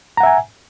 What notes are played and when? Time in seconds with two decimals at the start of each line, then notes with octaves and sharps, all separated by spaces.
0.17 A#5
0.20 F#5
0.23 E5
0.26 G#5